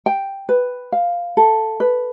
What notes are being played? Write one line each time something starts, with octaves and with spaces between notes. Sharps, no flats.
G5
B4
F5
A4
B4